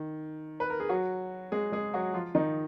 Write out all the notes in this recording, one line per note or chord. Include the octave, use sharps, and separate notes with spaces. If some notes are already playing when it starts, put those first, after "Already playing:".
Already playing: D#3
B4
A#4
G#4
F#3 F#4
G#3 G#4
G#3 G#4
F#3 F#4
F3 F4
D#3 D#4